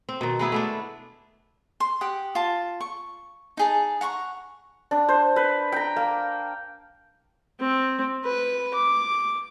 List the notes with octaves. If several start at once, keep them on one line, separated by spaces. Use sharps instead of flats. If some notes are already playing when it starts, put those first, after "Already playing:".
C4
B2 D#3
G#3 B3 E4 G#4
A3 B3 D4
C6
G4 F#5 D#6
F4 A5
C#6
D#4 G#4 A5
F#5 A#5 C6 C#6
D4
C5
B4
G5 A#5
A#3
C4
B4
D6